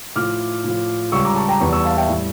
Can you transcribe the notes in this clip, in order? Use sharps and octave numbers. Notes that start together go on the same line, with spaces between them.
A2 F3 D6 F6
A2 F3
C#2 C#3 G3 C#6 E6
A#5 D6
A5 C#6
G5 A#5
E2 E3 G3 A5 C#6
C#6 E6
F5 A5
E5 G5
A2 G3